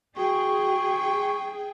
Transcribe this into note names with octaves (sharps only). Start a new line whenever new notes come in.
F#4 G#4 G5 C#6